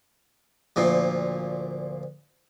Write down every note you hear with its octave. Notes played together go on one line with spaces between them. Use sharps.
D2 A#2 F3